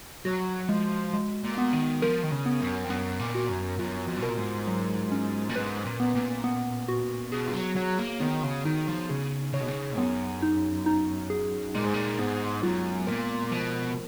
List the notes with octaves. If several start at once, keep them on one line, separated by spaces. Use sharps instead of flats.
F#3 F#4
F3 G#3
G#3
A#2
B3
D#3
F3 A#4
D#3
C#3
B3
F#2
F2
F#2 B3
A#2
F#4
F#2
F#2 F4
F2
B2 A#4
A#2
G#2
F#3
C#4
A#2
G#2 B4
A#2
B3
A#2
B3
F#4
B2 G#4
F3
F#3
F#3 C#5
A#3
D#3 B3
C#3
D#3 D#4
F3
C#3 G#4
C#3 C#5
B2
C#3
F#2 B3
D#4
D#4
G#4
A#2 G#3
G#2
A#2
G#2 B3
F#2 F4
A#2 A#4
B2 F3